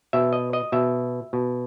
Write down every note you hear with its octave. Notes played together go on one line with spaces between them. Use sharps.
B2 E5
D#5
D#5
B2 E5
B2